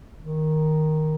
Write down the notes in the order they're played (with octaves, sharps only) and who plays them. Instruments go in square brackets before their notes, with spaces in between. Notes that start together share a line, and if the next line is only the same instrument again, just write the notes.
[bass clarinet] D#3